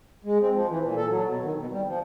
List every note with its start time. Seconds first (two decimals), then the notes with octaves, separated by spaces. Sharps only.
0.25 G#3
0.41 C4
0.53 F3
0.69 E3
0.83 A#2
0.97 A4
1.09 F#3
1.25 B2
1.43 D#3
1.57 B2
1.71 G3
1.87 F3